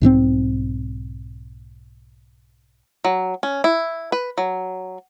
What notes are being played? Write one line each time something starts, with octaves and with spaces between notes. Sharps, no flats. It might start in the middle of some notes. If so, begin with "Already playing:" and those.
B1 G#2 D#3 C4
F#3
C#4
E4
B4
F#3